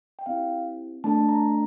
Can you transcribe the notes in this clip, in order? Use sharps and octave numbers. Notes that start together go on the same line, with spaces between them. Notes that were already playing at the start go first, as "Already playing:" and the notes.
G5
C4 E4 G4 F5
A3 D4 A4 A5
A#5